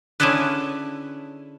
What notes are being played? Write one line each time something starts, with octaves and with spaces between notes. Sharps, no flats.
D3 C#4 E4 G#4 A4 B4